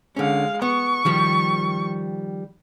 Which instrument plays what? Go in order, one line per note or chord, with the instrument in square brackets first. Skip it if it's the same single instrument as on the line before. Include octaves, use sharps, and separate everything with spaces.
[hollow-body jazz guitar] D3 C#4 [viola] G#3 F5
[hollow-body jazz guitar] B3 [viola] C#6
[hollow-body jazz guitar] D#3 F3 G3